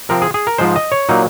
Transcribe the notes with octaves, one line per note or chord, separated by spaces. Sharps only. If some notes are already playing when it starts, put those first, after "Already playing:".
C3 F3 C4 A#4
G#4
G#4
A#4
G#2 F3 G#3 C5
D#5
C#5
A#2 F#3 A#3 D#4